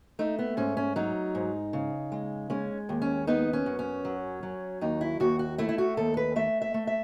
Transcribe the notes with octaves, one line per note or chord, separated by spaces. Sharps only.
A3 D#4
B3
G#2 C#4
C#4
F#3 D#4
G#2
C#3
G#3
G#3 C#4
D#2
C#4
B3 D#4
C#4
F#2
C#4
F#3
F#3
D#2 D#4
E4
D#2 F#4
F#4
A3 E4
E4
F#4
D#2 A4
B4
A3 E5
E5
A3
E5